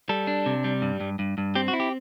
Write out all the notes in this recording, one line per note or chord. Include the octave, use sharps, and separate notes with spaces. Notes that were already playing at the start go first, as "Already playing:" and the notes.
G3 A4
D4
C3
G3
G2
G2
G2
G2
C4 G4
F#4
E4
G4